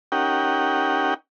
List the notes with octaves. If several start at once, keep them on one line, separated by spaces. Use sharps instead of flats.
C#4 D#4 G4 A#4 F#5 G5